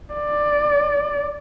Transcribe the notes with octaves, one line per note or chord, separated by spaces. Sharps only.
D5